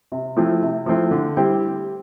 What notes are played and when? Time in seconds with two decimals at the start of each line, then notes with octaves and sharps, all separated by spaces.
0.12 C3
0.36 F3 A3 C4 E4
0.62 C3
0.86 F3 A3 C4 E4
1.11 D3
1.37 G3 C4 E4 G4